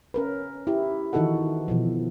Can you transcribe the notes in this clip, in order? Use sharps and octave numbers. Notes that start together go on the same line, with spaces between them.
C#4 A#4 B4
E4 G4
D#3 E3 D#4 F#4 A4 F#5
B2 E3 F3